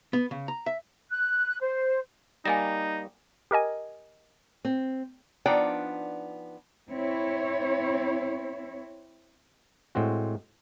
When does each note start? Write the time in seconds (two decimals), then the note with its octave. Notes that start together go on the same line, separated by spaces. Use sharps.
0.13 B3
0.31 C#3
0.48 A#5
0.66 E5
1.10 F#6
1.61 C5
2.45 G3 A#3 D#4 G#5 A6 A#6
3.51 G4 A#4 D#5 G#5
4.65 C4
5.46 F3 B3 D4 D#4 D5 G5
6.89 C4 E4 C#5
9.95 A2 G#3 C4 F#4